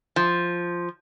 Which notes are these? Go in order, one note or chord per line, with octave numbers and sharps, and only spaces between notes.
F3